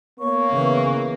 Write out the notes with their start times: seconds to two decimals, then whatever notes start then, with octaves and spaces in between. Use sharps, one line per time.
0.19 A#3 B3 C#5 C#6
0.52 C#3 E3 B3